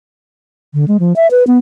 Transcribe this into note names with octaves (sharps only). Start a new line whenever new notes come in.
D3
G#3
F3
E5
B4
B3